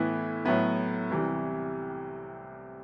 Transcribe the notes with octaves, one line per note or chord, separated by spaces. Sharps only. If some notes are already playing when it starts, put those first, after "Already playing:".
Already playing: A2 E3 B3 E4
A2 F#3 B3 E4
C2 C3 E3 G3